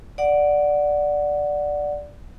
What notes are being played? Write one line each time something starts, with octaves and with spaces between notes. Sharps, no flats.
D5 F#5